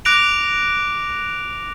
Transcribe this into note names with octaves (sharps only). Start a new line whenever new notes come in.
D6 F#6 A#6 D7 F7